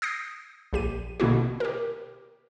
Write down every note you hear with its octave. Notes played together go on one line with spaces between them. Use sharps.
D#6 G6 A#6 C7
A#1 G4 D#7
B2 D3 A#3 E4 F#4
G4 A#4